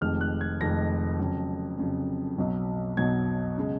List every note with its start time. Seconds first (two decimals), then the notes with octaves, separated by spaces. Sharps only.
0.01 F1 F2 D#3 G#3 F6
0.21 F#6
0.41 G#6
0.60 F1 F2 D#3 G#3 A#6
1.19 F2 C#3 F#3
1.79 F2 C#3 F#3
2.38 B1 B2 F#3
2.97 B1 B2 F#3 G#6
3.58 C#3 G#3